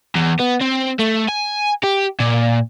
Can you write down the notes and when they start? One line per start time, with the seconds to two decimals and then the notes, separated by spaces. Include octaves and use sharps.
0.16 E2
0.40 B3
0.61 C4
0.99 A3
1.28 G#5
1.83 G4
2.20 A#2